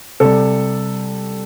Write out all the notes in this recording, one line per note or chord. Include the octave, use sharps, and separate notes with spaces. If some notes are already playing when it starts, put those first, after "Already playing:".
C3 G3 A4